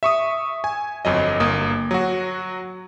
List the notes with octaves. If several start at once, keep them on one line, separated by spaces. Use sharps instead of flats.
E5 C#6 D#6
G#5
G1 F2 F#3 D#5
G1 A#3 D#6
F#3 F#4